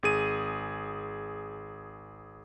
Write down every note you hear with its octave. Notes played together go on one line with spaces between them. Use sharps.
G#1 G#4 D#7